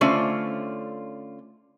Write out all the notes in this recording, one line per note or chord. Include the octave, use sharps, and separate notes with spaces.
D3 A3 C#4 F4 C5 D5